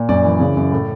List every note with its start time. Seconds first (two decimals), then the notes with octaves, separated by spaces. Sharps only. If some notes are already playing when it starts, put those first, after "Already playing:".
Already playing: A#2
0.09 F#2 D5
0.25 E3
0.40 C#3
0.57 F#2
0.72 A2